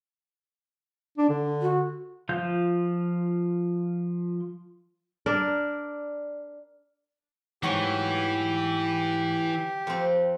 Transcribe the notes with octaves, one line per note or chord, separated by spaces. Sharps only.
D4
D3
F#4
F3 F4 F5 G6
D4 A#4 D5
G#2 E3 F#3 A3 F#4 G4 C#5
F2 C4